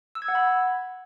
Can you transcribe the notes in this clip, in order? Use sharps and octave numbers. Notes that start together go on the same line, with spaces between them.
E6
G#6
F#5
B5